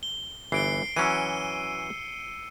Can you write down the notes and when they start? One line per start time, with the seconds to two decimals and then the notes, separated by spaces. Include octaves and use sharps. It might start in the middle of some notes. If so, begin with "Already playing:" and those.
0.03 G7
0.52 G1 E3 C7 D7 G7
0.96 E3 F#3 C#4 E6 C#7 D#7